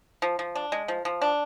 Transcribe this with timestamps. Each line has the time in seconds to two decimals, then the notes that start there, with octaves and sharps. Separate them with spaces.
0.22 F3
0.39 F3
0.55 D4
0.72 G#3
0.88 F3
1.05 F3
1.22 D4